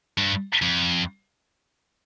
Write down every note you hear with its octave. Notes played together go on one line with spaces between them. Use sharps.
G2
F2